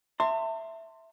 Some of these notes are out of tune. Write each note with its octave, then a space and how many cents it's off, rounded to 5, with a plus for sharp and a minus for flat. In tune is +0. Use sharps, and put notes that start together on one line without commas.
E5 +0 A5 +45 C6 +5